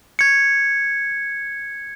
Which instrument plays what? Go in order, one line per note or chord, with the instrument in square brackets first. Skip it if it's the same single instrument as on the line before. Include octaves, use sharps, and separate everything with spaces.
[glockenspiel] G#6 C#7